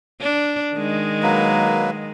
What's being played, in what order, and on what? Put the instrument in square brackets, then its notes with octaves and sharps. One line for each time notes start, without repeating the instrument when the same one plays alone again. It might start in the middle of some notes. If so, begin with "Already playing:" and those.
[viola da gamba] D4
D#3 G#3
[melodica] F#3 A#3 B4